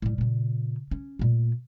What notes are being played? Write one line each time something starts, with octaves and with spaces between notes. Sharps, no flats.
A2 G3
A#2 C#3
C#4
A#2 A3